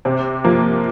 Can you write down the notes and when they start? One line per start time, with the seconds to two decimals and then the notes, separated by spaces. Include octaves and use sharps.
0.05 C3 C4
0.44 F3 A#3